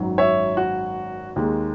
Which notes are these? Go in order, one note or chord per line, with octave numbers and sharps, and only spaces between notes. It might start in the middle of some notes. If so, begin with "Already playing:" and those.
Already playing: G#1 F#2 D#3 F#3
C#5 E5
F#4
D#2 D#3 G#3